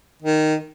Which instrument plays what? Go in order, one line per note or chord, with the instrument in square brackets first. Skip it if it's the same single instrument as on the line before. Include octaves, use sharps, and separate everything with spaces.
[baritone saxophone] D#3